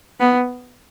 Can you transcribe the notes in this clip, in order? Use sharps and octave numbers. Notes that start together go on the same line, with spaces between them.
B3